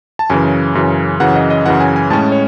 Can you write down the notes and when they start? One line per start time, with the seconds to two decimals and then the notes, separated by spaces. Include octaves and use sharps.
0.19 A5
0.30 F#2 C#3 E3 G#5
0.75 F#2 C#3 E3
1.20 F#2 C#3 E3 F#5
1.35 D#5
1.50 D#5
1.66 F#2 C#3 E3 F#5
1.80 G#5
1.96 G#5
2.10 A2 G#3 C#4 A5
2.32 C#5